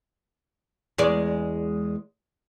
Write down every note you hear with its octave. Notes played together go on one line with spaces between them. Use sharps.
E2 G#3 D5